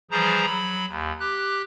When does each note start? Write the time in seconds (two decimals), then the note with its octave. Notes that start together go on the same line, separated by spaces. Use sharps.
0.11 E3 F3 G3 G#4 C5 A#5
0.46 F#3 B5
0.89 D#2
1.19 G4 F#6